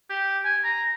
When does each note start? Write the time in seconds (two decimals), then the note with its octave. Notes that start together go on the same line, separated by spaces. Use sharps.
0.10 G4
0.45 G#5
0.64 A#5